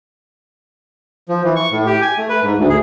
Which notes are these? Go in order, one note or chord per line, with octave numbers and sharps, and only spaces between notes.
F3
E3
C#6
A2
G4
G#5
A3
B4
G#2
D2
G#4